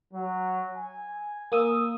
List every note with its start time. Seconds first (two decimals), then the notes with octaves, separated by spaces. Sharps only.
0.13 F#3
0.74 G#5
1.52 A#3 D#6 E6